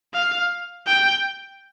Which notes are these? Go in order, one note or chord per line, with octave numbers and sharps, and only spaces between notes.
F5
G5